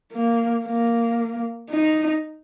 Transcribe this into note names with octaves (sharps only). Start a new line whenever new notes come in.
A#3
A#3
D#4